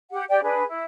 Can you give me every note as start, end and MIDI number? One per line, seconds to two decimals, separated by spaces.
0.12 0.24 67
0.12 0.24 78
0.30 0.40 67
0.30 0.40 74
0.30 0.40 79
0.43 0.62 62
0.43 0.62 68
0.43 0.62 71
0.67 0.85 64